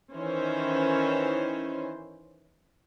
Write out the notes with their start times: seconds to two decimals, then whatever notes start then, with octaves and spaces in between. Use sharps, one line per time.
0.15 D#3 E3 C#4 C5